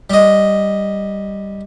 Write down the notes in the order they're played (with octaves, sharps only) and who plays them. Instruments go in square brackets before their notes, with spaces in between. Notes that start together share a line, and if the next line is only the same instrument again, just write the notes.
[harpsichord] G3 D#5